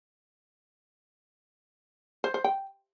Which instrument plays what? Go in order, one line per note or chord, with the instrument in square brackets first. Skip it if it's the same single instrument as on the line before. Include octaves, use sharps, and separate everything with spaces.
[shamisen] C5
C5
G5